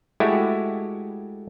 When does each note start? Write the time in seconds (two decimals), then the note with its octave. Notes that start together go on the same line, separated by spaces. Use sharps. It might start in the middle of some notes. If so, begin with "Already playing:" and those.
0.20 G#3 A3 E4 F#4 G4